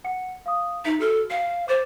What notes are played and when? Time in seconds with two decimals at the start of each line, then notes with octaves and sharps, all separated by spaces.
0.04 F#5 C#7
0.46 F5 D#6
0.85 D#4 E5 B6
1.00 F#4 A4 F6
1.30 F5 C7
1.68 C5 D6 A6